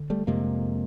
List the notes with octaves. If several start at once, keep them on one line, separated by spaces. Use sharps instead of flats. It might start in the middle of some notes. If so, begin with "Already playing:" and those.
Already playing: D3
G3 A3
F2 C3 G#3 A#3